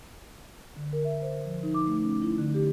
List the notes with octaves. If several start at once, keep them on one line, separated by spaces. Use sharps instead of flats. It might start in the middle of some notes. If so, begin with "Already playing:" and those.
D3
A#4
E5
C5
F3
D#4
D6
A3
C#4
E4
D3
G4